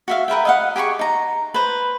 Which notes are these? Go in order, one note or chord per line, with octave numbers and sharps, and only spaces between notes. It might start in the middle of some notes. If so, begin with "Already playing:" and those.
F#4 E5 F5
A#4 B4 E5 G5
D#5 F5 F#5
G4 G#4 B5 C#6
D#4 A#5
B4 C5